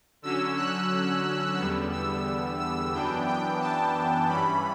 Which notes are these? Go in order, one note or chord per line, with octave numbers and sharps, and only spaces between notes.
D3 F#3 C#4 E6
F#6
E2 D3 G3 B3 E6
E6
E6
F#2 E3 B3 D4 G5
G5
A5
G2 E3 G3 C#4 B5